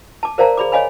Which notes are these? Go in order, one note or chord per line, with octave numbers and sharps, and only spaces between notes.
A5 D6
A#4 C5 D5 F5 A5 A#5
G#4 D5 B5 D6
C#5 D#5 F5 G#5 B5